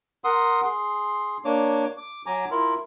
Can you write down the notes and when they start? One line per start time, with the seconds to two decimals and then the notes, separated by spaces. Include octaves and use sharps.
0.24 A#4 F#5 C6 D#6
0.64 G#4 C6
1.45 A#3 D4 C#5 D6
1.97 D6
2.26 F#3 G#5 A#5 D6
2.51 E4 F4 A#4